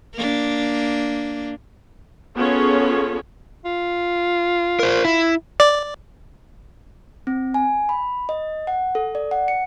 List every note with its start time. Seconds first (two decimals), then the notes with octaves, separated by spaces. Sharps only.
0.15 A#3 D4
2.35 B3 C#4 F4 G#4 A4 C#5
3.65 F4
4.79 A#4 C5
5.05 E4
5.60 D5
7.27 C4
7.54 G#5
7.89 B5
8.29 D#5
8.67 F#5
8.95 A4
9.15 D5
9.31 F#5
9.48 C#7